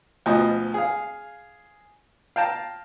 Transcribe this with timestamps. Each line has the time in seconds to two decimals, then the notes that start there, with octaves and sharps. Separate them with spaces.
0.26 D2 B2 F3 D#5
0.74 G#4 F5
2.36 F5 G5 A5 A#5